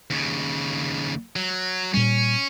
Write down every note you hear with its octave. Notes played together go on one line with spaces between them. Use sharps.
D#2 C#3
F#3
A#2 G3 C#4